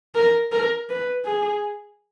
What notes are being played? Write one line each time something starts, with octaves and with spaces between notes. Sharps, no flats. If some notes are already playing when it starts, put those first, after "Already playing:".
A#4
A#4
B4
G#4